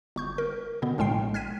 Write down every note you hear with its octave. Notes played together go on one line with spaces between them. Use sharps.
G1 C#6 G6
A#4
B2 D3 B3
A#1 A2 G#3 G5 C7
F6 G#6 B6 D#7